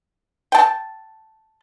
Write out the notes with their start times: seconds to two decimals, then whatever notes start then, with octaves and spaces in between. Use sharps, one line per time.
0.52 G5 A5